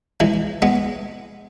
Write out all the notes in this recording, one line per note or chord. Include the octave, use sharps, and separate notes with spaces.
E3 G#3
G#3 B3